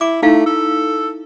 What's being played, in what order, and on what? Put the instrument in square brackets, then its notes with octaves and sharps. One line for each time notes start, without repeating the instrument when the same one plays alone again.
[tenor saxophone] E4 [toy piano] D6
[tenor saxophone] A3 [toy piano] D#4 E4 F5
[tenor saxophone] A4